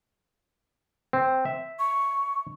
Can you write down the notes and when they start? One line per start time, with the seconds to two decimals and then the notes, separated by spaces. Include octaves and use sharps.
1.13 C4
1.45 E5
1.79 C#6